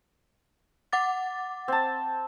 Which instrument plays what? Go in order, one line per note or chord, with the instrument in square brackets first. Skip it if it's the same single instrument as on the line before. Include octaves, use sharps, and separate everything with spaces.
[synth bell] F#5 D6 A6
[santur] C4 A5